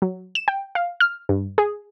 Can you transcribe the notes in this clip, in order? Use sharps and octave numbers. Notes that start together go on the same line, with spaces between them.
F#3
E7
G5
F5
F6
G2
G#4